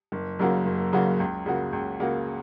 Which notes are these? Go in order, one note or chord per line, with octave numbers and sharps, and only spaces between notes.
F#1
F#2 C#3 A#3 F#4
F#1
F#2 C#3 A#3 F#4
C#2
C#3 A#3 F#4
C#2
C#3 A#3 F#4